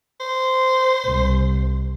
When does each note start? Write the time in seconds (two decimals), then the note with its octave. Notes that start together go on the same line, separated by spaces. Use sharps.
0.20 C5
1.05 C2